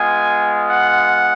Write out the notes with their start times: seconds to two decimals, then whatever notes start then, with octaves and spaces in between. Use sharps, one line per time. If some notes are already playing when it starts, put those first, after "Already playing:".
Already playing: G#3 B3 F4 G#5
0.70 F#5